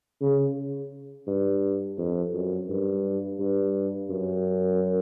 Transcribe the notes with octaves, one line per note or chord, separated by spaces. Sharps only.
C#3
G2
F2
F#2
G2
G2
F#2